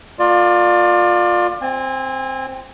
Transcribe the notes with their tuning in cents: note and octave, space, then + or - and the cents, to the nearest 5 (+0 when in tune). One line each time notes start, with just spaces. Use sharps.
A#3 -30 F4 +20 D5 +25
C4 +0 G#5 -30